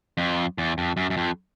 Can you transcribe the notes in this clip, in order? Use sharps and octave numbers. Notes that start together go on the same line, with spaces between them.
F2
E2
F2
F#2
F#2
F2